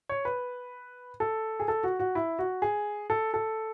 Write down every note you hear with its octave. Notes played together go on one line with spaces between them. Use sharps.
C#5
B4
A4
G#4
A4
F#4
F#4
E4
F#4
G#4
A4
A4